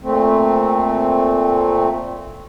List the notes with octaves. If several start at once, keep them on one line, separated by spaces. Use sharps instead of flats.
A#2 A3 C4